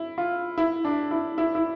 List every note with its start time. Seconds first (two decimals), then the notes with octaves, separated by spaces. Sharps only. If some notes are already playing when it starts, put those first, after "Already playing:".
Already playing: E4
0.18 F4
0.58 E4
0.85 D4
1.11 E4
1.38 E4
1.55 E4